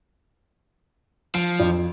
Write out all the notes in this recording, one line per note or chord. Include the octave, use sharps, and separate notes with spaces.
F3 D7
F2